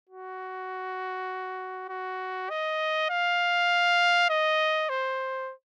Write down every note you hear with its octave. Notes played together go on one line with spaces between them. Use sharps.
F#4
F#4
D#5
F5
D#5
C5